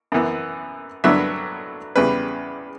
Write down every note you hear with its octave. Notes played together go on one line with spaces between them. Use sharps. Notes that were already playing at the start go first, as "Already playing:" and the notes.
F#2 E3 B3
G2 D3 F#3 B3 D4 E5
E2 C#3 G3 B4